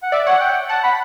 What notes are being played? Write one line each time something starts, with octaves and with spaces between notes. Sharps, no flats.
F#5
D5 E5
C#5 F#5
G5
F#5 A5
B5